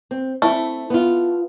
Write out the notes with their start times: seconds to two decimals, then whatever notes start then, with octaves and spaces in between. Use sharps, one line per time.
0.11 C4
0.42 A3 C4 E4
0.90 B3 F4